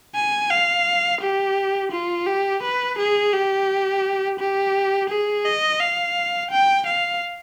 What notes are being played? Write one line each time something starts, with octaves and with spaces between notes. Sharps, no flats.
G#5
F5
G4
F4
G4
B4
G#4
G4
G4
G#4
D#5
F5
G5
F5